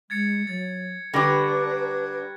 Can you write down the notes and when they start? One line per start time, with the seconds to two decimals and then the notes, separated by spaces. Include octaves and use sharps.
0.10 G#3 G#6 A6 C#7
0.47 F#3 A6
1.14 D3 G3 D4 B4 A#5 C#6 F#6 G#6